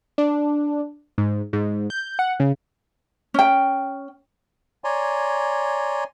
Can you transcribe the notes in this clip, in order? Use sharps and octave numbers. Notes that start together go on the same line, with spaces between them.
D4
G#2
G#2
G6
F#5
C#3
C#4 G5
C#5 D5 G#5 A#5 C6